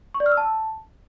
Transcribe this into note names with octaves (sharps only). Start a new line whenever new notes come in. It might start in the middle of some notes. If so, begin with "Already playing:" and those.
C#6
D5
F6
E6
A5